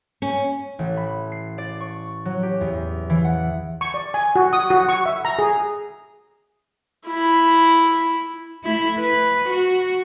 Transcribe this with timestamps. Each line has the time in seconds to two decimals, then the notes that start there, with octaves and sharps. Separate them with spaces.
0.22 C#4
0.79 A1
0.97 B5
1.32 C7
1.58 D5
1.80 C#6
2.25 F#3
2.43 G4
2.61 E2
3.10 E3
3.24 F#5
3.81 C#6
3.94 D5
4.14 G#5
4.36 F#4
4.53 D#6
4.70 F#4
4.89 C#6
5.06 E5
5.25 A#5
5.39 G#4
7.07 E4 B5
8.64 A3 E4
9.00 B4
9.50 F#4